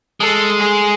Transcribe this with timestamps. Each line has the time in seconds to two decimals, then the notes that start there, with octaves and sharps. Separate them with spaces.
0.20 G#3 A4
0.59 G#4